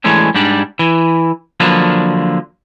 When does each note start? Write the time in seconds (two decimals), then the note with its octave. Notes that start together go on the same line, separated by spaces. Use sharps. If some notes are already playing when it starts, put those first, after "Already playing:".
0.04 E3 G#3 A3 C#4 D4
0.35 G#2 G3 D4 D5
0.79 E3
1.60 D3 F3 F#3 A#3 D4 B4